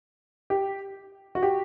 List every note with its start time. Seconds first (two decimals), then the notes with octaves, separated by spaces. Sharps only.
0.50 G4
1.35 F#4
1.43 G4